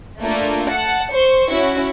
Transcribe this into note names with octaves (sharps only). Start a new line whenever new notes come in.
A3 A#3 D4 F4
F#5 A5 C#7
C5 C6 C#6
C#4 E4 F#4